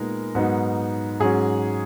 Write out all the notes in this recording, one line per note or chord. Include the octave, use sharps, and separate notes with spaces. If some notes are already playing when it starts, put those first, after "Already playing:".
Already playing: A#2 G#3 B3 D#4 A#4
G#2 F#3 B3 D#4
G#2 F#3 C#4 G#4